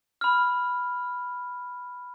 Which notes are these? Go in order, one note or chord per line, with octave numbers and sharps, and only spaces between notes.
B5 F6